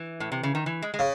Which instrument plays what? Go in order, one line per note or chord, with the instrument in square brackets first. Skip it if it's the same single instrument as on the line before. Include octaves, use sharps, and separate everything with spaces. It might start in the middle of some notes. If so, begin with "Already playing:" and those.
Already playing: [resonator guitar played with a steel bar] E3
A2
C3
C#3
D#3
E3
G#3
G#3
[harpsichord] C#3